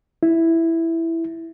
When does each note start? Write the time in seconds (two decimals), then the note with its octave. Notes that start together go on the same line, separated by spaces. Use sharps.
0.23 E4